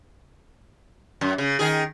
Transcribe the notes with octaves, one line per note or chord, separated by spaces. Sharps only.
F#2
C#3
D#3 G#4